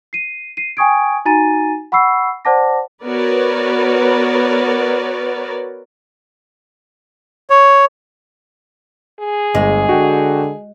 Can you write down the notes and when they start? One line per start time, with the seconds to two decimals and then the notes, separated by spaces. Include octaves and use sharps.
0.13 C7 D#7
0.57 C7 D#7
0.77 G5 G#5 C#6 D#6 G#6 D7
1.25 D#4 F#4 G#5 A#5 A6 D#7
1.92 F#5 B5 C#6 E6 C7
2.45 C5 D5 F#5 A5 D6 A#6
3.04 B3 F#4 A#4 B4 C#5 D5
7.50 C#5
9.20 G#4
9.55 G1 G#3
9.89 D3 F#4 G5